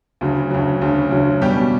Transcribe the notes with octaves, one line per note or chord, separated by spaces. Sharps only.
D2 C#3 F#3
D2 C#3 F#3
D2 C#3 F#3
D2 C#3 F#3
B2 G3 C#4 G4